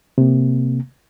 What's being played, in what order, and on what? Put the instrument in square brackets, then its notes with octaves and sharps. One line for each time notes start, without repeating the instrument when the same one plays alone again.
[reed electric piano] C3 A#3